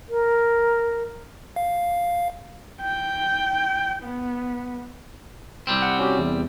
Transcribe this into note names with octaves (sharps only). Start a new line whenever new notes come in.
A#4
F5
G5
B3
C2 G3 C4
F#5
C#4 F#4 G4
E2